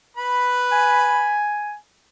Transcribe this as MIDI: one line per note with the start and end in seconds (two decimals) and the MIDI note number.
0.17 1.39 71
0.17 1.39 83
0.72 1.75 80